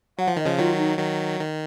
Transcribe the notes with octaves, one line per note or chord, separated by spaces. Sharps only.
F#3 F#5
F3
D#3 D#5
C#3 F3
D#3 F#3 F4
D#4
D#3 F#3
D#3